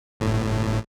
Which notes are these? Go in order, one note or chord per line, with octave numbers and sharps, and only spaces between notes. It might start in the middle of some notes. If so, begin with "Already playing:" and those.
G1 A2